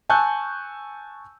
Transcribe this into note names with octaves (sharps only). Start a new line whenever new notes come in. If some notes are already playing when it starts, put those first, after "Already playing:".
G#5 A5 C#6 E6 F#6 G6